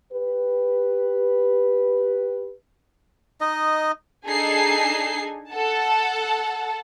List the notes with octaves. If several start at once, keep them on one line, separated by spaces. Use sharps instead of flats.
G4 B4
D#4 D#5
D4 D#4 G#4 A4 G#5 C7
A4 F#5 A5